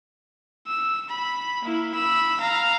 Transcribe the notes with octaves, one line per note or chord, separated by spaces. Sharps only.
E6
B5
A#3 E4
B5 E6
F5 A#5